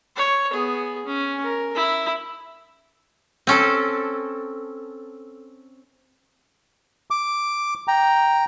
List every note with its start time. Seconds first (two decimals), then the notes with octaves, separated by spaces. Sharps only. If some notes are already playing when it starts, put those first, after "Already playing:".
0.17 C#5
0.52 B3 G#4
1.06 C#4
1.43 A#4
1.75 E4
3.47 C4 C#4 A4
7.11 D6
7.88 G5 A#5